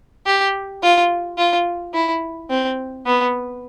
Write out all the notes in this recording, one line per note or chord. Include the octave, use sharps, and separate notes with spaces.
G4
F4
F4
E4
C4
B3